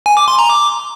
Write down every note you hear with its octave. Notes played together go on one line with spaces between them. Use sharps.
G#5
D6
C6
A#5
D6